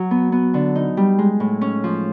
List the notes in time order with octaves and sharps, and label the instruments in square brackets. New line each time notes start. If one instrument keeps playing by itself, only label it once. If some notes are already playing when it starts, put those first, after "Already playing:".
Already playing: [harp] F#3
B3
B3
D3
D#4
G3
G#3
A2
C#4
F3